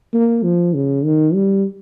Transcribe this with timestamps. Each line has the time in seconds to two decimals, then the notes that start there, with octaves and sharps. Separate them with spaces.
0.14 A#3
0.44 F3
0.74 C#3
1.04 D#3
1.34 G3